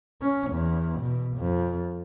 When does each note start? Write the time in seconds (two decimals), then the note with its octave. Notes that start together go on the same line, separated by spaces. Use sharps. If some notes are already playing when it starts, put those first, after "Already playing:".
0.22 C#4
0.51 E2
1.01 B2
1.37 F2